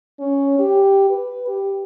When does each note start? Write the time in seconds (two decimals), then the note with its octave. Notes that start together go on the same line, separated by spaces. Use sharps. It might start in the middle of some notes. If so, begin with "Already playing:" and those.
0.20 C#4
0.59 G4
1.10 B4
1.48 G4